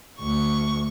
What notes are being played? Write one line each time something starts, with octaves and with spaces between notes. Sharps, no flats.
D2 C#6